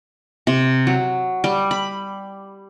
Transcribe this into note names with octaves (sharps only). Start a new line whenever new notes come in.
C3
F#3
G3
B5